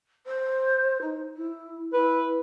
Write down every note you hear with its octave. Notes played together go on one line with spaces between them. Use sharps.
C5
D#4
E4
E4 B4